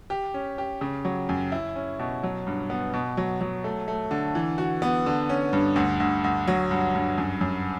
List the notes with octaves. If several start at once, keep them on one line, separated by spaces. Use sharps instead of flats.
G4
C#4
G4
C#3
F#3
F#2
E4
C#4
B2
F#3
G2
B3
B2
F#3
F#3
A3
A3
D3
E3
F#4
B3
D3
C#4
G2
D2
D2
D2
F#3
G2
G2
F#2
F#2